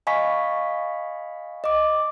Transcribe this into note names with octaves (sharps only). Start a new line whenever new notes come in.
D#5 F5 G#5 B5 C#6 B6
D#5 D6